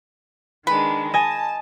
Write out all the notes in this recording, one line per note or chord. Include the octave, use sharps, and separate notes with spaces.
D#3 G#3 D4 B4
D#5 G#5 A5